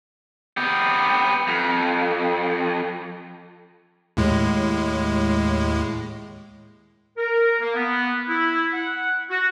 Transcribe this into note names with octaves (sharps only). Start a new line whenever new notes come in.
B3 G4
F2
D#2 A2 G#3
A#4
A#3
B3
E4
F#5
F#4